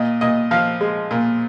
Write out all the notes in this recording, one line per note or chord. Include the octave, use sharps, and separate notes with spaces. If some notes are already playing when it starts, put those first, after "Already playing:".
Already playing: A#2 D#5
A#2 D#5
F3 F5
G#3
A#2